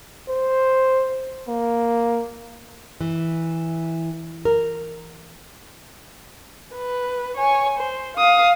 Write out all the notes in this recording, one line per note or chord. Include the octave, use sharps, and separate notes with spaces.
C5
A#3
E3
A#4
B4
C#5 G#5
C5
F5 D#6